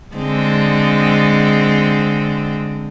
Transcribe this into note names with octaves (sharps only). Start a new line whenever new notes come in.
D3 G#3 C4